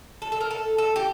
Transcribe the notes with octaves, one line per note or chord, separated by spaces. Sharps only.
A4
A4
A#4
A4
A4
G4